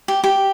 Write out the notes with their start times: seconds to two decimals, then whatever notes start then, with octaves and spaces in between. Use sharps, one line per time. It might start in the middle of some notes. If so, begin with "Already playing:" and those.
0.08 G4
0.24 G4